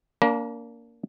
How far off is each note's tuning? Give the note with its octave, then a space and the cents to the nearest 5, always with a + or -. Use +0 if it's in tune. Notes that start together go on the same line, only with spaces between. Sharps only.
A#3 +0 D4 -30 A#5 +40